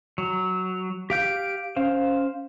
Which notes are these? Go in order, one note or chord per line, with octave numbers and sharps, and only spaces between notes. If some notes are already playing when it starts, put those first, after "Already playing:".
F#3
G4 F5 G6 D7
C#4 C5 F5